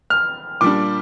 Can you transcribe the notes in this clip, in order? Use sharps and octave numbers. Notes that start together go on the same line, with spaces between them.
F6
A#2 G3 D4 D6